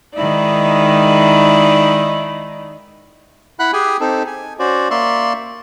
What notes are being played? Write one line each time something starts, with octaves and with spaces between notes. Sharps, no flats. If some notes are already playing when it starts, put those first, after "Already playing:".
D#3 G#3 D#4 E4 D5
E4 F#5 B5 F#6
G4 G#4 G#5
C4 D#4 A4
G#5
C#4 F#4 C5 D5
A#3 D5 E5 C6 C#6